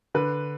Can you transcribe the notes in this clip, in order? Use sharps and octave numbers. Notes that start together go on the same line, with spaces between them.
D3 B4